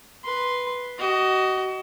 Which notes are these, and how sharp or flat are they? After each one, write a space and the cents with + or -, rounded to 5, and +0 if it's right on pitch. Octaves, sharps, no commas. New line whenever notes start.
B4 +0 C6 +0
F#4 +30 D#5 +0